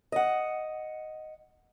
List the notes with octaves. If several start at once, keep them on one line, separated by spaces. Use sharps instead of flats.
D#5 F#5